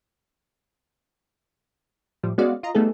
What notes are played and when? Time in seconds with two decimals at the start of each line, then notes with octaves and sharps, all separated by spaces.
2.23 A2 F3 G3
2.38 G#3 B3 C#4 F#4 D5 F5
2.63 F4 D#5 A#5
2.75 G3 A3 B3 D#4 G#4 A4